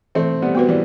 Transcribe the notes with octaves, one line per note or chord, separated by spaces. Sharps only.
E3 A3 C4
G3 B3
B3 F#4 B4
E3 G3